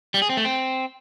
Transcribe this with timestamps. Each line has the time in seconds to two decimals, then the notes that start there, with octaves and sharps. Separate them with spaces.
0.14 G3
0.22 G#4
0.29 C4
0.37 A3
0.45 C4